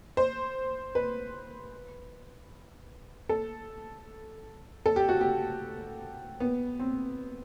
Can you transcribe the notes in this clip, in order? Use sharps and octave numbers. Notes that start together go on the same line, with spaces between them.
C5
B4
A4
A4
G4
F#4
G4
B3
C4